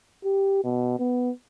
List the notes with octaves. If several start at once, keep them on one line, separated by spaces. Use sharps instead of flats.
G4
B2
B3